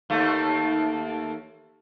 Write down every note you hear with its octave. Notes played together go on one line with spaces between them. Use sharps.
D#2 A3